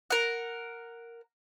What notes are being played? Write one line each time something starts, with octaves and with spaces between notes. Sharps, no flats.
A#4 F#5